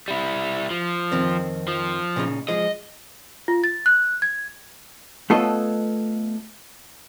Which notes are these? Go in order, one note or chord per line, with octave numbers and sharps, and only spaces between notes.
G3 E4
F3
F2 D#3 C4
F3
A#2 C#3 D#4
F3 G#3 D#5
F4
A6
F#6
G#6
A3 B3 F4 A4 C#5 D#5